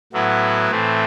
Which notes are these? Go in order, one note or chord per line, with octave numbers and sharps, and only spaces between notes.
A2 F#3 B3 E4
A2 E3 A3 C4